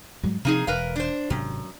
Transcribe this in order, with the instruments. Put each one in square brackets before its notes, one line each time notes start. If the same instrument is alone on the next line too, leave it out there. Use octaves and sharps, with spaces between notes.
[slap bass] G#2 F#3 G#3
[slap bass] C3 F3 [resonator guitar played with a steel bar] A#3 D#4 G#4
[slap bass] E1 [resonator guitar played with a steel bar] A#4 B4 F5
[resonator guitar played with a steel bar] D4 C5
[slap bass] G#1 C3 A3 [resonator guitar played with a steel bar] F#2